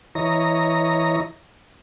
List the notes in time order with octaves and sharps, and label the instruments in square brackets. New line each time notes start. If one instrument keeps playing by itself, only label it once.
[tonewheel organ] E3 E4 C#5 D#5 A#5 A#6